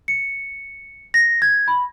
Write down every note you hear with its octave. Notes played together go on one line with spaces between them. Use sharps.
C#7
A#6
G#6
B5